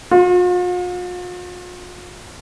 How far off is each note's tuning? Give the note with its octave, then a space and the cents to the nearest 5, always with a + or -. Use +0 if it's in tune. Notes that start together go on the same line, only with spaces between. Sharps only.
F4 +45